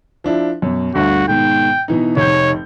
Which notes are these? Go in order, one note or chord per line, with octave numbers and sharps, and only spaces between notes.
F3 D4 E4
F#2 B2
G1 D2 G2 F#4
G#2 B2 D#3 G5
B2 E3 D#4
F1 D#4 C#5 G6